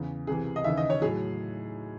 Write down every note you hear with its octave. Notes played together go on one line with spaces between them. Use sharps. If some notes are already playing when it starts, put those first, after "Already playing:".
Already playing: E2 C#3 E3
C2 C3 E3 G#4
D#5
D#2 C#3 E3 E5
D#5
C#5
A2 F#3 G#4